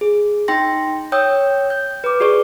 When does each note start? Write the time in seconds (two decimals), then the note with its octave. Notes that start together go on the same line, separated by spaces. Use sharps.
0.01 G#4
0.48 D#4 G5 C6 A#6
1.12 C#5 G5 D#6 E6 G6
1.70 G6
2.04 B4 D6
2.20 F#4 G#4 D5 C#6